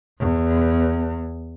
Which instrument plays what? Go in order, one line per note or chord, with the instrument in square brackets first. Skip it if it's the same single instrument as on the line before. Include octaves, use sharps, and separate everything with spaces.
[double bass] E2